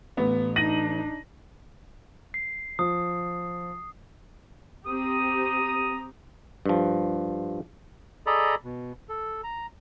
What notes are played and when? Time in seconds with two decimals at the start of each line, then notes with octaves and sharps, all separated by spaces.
0.17 A1 B3
0.56 D4 D#4 A#6 D#7 F#7
2.34 C7
2.79 F3 D#6
4.86 C4 G4 A#5 D#6
6.66 G2 F3
8.27 G#4 A4 D5 D#5 A#5 B5
8.64 B2
9.09 A4
9.44 A#5